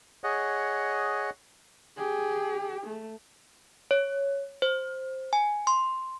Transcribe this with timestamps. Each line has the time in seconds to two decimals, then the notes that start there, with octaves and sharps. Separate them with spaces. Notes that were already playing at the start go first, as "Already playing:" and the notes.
0.24 G#4 C#5 D#5 F#5
1.97 G4 G#4
2.87 A3
3.91 C#5
4.62 C5
5.33 G#5
5.67 C6